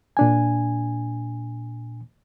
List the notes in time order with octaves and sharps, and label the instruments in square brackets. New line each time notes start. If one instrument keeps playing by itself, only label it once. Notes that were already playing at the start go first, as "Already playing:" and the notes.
[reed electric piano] A#2 D4 G#5